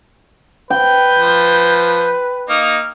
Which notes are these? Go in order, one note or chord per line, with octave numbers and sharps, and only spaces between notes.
B4 G5 G6
F3
A#3 D#4 F6